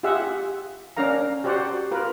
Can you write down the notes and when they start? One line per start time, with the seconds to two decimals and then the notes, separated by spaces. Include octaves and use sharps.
0.03 F4 G4 G#4 E5 F#5
0.97 C#4 D4 A#4 F5 A#5
1.44 F#4 G4 C5 D5 F#5
1.91 F4 A#4 B4